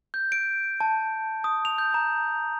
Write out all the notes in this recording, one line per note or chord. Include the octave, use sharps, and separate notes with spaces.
G6
D7
A5
D#6
F7
G6
A#5